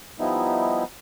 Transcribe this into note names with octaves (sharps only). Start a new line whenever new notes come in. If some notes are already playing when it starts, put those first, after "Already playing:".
F3 G3 B3 D#4 E4